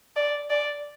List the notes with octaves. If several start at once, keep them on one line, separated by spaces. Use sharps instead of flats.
D5
D5